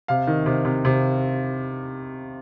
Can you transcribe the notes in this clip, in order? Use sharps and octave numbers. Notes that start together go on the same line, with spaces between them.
C3 F5
D#3
C3
C3
C3